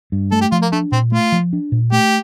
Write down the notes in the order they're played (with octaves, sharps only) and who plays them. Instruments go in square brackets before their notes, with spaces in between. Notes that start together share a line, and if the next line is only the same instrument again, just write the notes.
[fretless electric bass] G2
[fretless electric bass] A3 [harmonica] A4
[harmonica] G4
[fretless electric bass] F3 [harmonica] F4
[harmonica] A#3
[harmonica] A3 [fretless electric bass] D4
[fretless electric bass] A#2 [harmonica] C4
[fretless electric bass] A3 [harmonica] F4
[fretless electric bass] F3
D4
A#2
[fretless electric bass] A3 [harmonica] G4